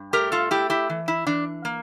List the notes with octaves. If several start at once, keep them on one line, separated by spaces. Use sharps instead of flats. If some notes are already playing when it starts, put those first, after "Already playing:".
Already playing: G2
A3 G4 A#4
F4 A4
A3 E4 G4
E4 G4
E3
E4
E3 D4
A#3